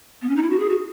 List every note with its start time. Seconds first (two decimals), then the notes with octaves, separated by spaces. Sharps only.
0.22 B3
0.29 C#4
0.36 D#4
0.43 E4
0.50 F#4
0.60 G#4
0.70 F#4